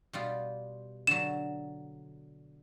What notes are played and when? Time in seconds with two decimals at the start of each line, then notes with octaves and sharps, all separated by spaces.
0.13 B2 G3 F4
1.07 D3 F#3 E7